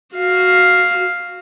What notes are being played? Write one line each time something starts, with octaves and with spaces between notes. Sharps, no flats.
F#4 F5